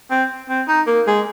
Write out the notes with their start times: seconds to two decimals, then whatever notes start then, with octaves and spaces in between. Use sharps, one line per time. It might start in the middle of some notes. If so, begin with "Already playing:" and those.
0.11 C4
0.49 C4
0.68 D#4
0.87 A#3
1.07 G#3